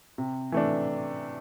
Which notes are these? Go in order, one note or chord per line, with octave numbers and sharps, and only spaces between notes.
C3
E3 A3 D4